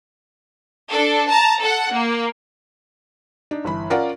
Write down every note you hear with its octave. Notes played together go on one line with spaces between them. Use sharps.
D4 A4
A5 A#5
A4 F#5
A#3
D4 D#4
G1 E3 B5
C#4 F4 A#4 D5 F5 F#5